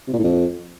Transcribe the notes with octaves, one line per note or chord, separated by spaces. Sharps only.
C3
A#2
A2
F2